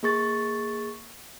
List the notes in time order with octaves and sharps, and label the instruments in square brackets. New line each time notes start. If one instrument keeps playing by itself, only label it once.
[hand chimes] A#3 G#4 C#6 A6